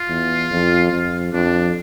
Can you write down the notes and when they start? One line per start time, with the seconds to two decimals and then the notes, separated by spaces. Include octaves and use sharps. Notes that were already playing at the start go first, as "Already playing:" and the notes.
Already playing: F4
0.09 E2
0.51 F2
0.92 F2
1.33 F2 D4